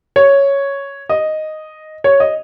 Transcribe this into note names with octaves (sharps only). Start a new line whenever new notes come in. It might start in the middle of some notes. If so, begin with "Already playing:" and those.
C#5
D#5
C#5
D#5